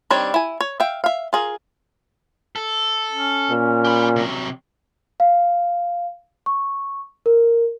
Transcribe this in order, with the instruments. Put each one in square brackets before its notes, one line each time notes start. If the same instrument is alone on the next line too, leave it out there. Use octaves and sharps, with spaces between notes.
[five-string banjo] D#3 G3 C4 D4 C#5
E4 G#5
C#5
E5 F5 G5
E5 F5
F4 G#4 A#4
[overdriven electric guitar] A4
[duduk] C#4
[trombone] A#2
[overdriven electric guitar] G4 B5
C3 F#3
[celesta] F5
C#6
A#4